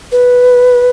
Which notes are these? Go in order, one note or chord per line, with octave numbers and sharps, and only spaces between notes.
B4